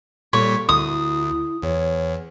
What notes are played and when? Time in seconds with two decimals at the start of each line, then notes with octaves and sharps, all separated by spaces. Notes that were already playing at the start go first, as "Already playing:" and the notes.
0.33 A#2 G3 A4 C#5 B6
0.69 D2 E4 D#6
1.63 E2 C#5